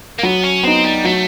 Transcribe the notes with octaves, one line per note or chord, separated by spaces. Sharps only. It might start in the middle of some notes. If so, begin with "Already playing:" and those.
A#3
F#3 B3
C#4
B3 C4 D#4
G3
F#3 A3